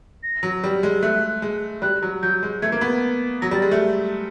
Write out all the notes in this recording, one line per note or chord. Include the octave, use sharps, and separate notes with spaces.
A#6
F#3
G3
G#3
A3 F#6
G#3
G3 F#6
F#3
F#3 G6
G#3
A3 G#6
A#3
B3
F#3 A#6
G3
A6
G#3
A3